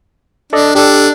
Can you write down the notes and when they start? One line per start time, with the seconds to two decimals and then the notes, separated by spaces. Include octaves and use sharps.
0.53 D4 A4 D5 D#5
0.75 D4 G4 A4